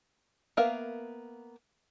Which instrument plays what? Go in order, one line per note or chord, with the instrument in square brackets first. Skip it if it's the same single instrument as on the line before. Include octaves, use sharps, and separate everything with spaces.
[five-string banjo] A#3 B3 A#4 E5 F5